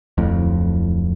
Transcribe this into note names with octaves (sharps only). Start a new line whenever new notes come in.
D1 F2 A2